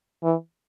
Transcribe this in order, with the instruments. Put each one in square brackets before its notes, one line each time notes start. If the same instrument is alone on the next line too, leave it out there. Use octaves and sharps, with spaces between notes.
[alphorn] E3